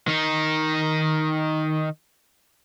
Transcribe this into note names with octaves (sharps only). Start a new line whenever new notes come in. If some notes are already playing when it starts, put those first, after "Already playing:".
D#3 D#4